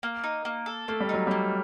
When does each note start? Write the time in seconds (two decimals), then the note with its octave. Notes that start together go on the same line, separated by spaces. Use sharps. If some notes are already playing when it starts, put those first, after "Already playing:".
0.03 A#3
0.24 D#4
0.45 A#3
0.66 A4
0.88 A3 A#3
1.00 G3
1.09 F#3 D#4
1.27 G3 A#3